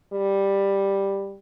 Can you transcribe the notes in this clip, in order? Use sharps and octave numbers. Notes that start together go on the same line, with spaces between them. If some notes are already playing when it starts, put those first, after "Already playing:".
G3